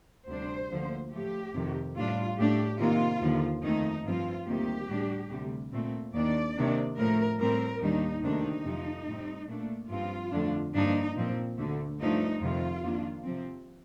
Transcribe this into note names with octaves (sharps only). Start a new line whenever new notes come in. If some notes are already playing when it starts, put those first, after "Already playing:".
D2 C3 G3 D4 C5
D2 D3 F3 A#3
A2 F3 A3 G4
F2 C3 D#3
A2 G3 D4 F4
A2 A3 D4 G4
C3 D#3 A#3 F4
D#2 D3 F3
F2 D#3 A3 D#4
G2 F3 C4 F4
D2 C3 D#3 G3 A#3 G4
A2 G3 D4
D2 C3 G3
A#2 A3 C4
D#2 D#3 A#3 D4 D5
C3 D#3 A#3 D4
A2 F3 A3 A#4
A2 G3 C4 A#4
D#2 D#3 G3 D4 D#4
D2 C3 D#3 A#3 D4 D#4
F2 C3 F3
A2 G3 C4
A#2 A3 D4
G2 F3 C4 F4
F2 D3 A3 D4
G2 F3 A#3 D4 D#4
A#2 F3 C4
D2 D3 A3
G2 F3 A3 D4 D#4
F2 C3 D#3 F4
F2 D#3 A#3 D4
C3 F3 C4